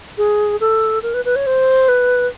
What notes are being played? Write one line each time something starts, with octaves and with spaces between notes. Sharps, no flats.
G#4
A4
A#4
B4
B4
C#5
C5
B4